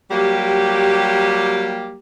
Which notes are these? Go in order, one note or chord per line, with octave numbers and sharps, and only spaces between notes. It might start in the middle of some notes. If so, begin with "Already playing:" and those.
F#3 G3 A#3 G4